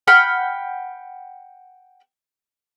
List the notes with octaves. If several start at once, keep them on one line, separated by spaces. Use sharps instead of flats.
F#5 G5 B5 F6